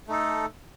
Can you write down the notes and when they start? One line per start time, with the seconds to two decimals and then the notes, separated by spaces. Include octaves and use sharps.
0.08 A3 D#4 A4